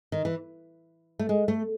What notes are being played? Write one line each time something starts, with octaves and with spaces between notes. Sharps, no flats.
D#3
E3
A3
G#3
A3